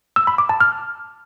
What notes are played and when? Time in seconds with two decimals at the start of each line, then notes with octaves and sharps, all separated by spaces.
0.16 E6
0.27 B5
0.38 D6
0.49 A5
0.60 F6